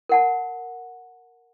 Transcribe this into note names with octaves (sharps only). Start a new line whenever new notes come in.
A#4 F#5 A5